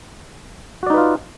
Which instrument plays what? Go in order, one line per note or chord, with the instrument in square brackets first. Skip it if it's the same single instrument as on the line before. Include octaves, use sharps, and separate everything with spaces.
[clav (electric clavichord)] F#4
D5
D#4
B4
F4